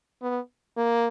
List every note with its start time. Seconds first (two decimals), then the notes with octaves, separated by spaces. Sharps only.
0.22 B3
0.77 A#3